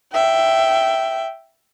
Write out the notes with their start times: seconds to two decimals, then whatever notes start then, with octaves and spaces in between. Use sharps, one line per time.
0.13 E5 G5